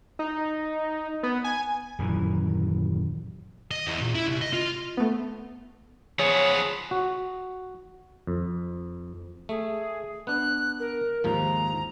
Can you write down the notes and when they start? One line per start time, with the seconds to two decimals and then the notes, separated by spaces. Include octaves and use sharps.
0.19 D#4
1.23 B3
1.44 G#5
1.99 D#1 F#2 E3
3.71 D#5
3.87 E2
4.02 A#2
4.15 E4
4.28 C2
4.42 D#5
4.53 F4
4.97 A3 B3
6.19 F3 B3 G#4 C#5
6.91 F#4
8.27 F2
9.49 A3 G#4
10.27 B3 D4 F#6
10.79 A#4
11.24 D#2 G#2 F3 A#5